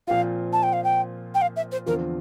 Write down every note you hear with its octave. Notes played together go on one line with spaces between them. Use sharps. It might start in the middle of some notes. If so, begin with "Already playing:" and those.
A#2 F3 C4 F4 F5
A5
G5
F5
G5
G5
F5
E5
C5
E2 D3 F3 C4 F4 A#4